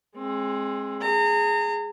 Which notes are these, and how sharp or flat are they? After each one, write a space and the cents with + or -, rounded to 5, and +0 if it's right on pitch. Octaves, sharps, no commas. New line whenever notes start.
G#3 +0 C4 +30
G#4 +0 A#5 -35